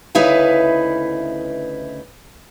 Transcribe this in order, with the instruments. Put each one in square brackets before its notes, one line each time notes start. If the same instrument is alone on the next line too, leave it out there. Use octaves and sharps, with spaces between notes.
[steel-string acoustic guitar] D2 C#3 D#4 E4 B4 F5